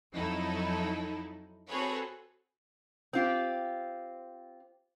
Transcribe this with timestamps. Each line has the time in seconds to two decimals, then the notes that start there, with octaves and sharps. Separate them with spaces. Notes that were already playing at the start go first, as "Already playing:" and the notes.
0.13 F2 F#3 D#4 E4 A4
1.68 C4 F#4 G#4 A4 B4 C#5
3.13 C4 F4 G4